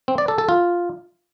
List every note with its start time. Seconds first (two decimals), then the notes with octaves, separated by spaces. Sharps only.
0.08 C4
0.18 D5
0.28 A4
0.38 A4
0.49 F4